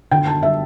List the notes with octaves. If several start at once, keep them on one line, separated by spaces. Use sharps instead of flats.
D3 G5
A5
G3 E5